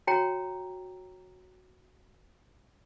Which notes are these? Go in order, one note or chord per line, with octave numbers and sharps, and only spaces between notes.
F#4 C#5 G5 A#5